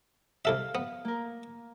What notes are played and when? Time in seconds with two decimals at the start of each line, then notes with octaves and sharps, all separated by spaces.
0.45 C2 A4 E5 F5
0.75 B3
1.05 A#3 A#4